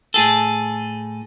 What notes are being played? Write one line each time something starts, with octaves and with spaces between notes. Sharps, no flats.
A2 G#4 A4